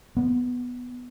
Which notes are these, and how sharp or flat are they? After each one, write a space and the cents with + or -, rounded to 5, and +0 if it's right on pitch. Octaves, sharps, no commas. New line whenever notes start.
B3 +0